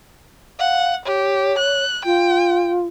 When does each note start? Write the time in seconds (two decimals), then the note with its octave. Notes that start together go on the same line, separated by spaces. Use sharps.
0.59 F5 F#5
1.06 G4 C#5
1.59 F#6
2.05 F4 G5